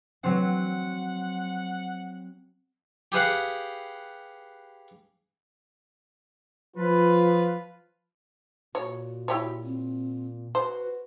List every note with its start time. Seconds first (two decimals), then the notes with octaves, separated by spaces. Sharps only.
0.24 F#3 C4 F#5
3.12 G4 G#4 B4 F5 F#5
6.76 F3 F4 B4
8.75 A#2 F#4 C#5
9.28 E4 G4 C#5
9.63 C4
10.55 F#4 B4 C5